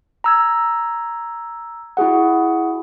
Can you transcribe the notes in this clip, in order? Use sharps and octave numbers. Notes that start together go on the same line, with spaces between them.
A#5 E6 G#6
E4 F#4 G#4 F#5